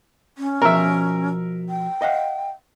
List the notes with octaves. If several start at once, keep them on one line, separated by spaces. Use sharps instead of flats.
C#4
B2 F3 A#4 E5
G5
D#5 F5 F#5